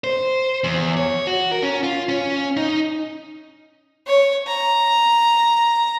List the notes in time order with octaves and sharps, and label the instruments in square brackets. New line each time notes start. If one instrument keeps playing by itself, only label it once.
[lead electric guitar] C5
E2
C#5
F#4
A#4
C#4
F4
C#4
D#4
[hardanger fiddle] C#5
A#5